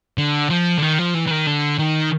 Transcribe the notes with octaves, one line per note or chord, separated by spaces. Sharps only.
D3
F3
D3
D#3
F3
E3
E3
D#3
D3
D#3